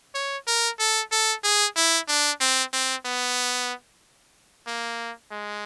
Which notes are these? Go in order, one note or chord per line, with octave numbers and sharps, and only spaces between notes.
C#5
A#4
A4
A4
G#4
E4
D4
C4
C4
B3
A#3
G#3